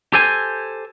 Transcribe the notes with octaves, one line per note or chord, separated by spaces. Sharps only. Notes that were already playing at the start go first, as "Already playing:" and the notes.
G4 A4 C5 G#5